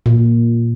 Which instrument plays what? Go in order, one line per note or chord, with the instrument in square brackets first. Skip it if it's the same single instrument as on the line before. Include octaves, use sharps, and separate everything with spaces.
[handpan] A#2